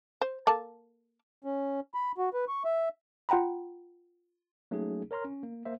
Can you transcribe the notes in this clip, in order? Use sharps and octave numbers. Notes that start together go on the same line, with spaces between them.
C5
A#3 A4 A5
C#4
B5
F#4
B4
C#6
E5
F4 F#5 G5 A#5 B5
F#3 A3 A#3 C#4 D#4 G#4
A#4 C#5 A#5 C6 F6
C#4
A#3
A#3 C5 E5